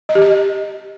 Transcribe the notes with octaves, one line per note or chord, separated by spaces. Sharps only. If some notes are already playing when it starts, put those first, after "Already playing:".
D#5
G4
D#5